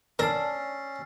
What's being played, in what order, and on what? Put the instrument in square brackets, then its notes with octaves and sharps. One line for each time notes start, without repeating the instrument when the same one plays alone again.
[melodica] C#4 [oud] D4 [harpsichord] A#4 [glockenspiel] E6 A6 C7